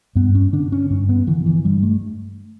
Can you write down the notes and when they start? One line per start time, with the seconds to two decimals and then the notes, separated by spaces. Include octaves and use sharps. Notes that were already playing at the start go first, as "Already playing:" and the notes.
0.15 G2 B3
0.35 C#4
0.53 D3 D4
0.72 C#4
0.90 G2 C#4
1.09 B3
1.27 D3 E3
1.46 E3
1.65 G2 G3
1.83 A3